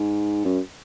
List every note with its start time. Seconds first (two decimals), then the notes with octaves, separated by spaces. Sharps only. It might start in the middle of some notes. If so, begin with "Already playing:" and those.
Already playing: G#2
0.45 F#2